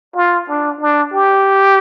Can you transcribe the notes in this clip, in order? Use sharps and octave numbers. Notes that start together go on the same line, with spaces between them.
F4
D4
D4
G4